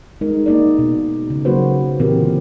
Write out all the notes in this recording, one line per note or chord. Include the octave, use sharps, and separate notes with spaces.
G#3 D#4 A#4
A#3 D#4 D5
B2
C#3
F#3 A#3 F#4 B4 C5
A#2 D3 E3 C4 G4 A#4